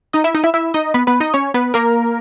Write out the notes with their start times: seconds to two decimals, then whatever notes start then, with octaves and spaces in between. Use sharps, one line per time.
0.13 D#4 D#5
0.24 E4 E5
0.35 D#4 D#5
0.44 E4 E5
0.54 E4 E5
0.74 D#4 D#5
0.94 B3 B4
1.07 B3 B4
1.20 D#4 D#5
1.34 C#4 C#5
1.54 B3 B4
1.74 A#3 A#4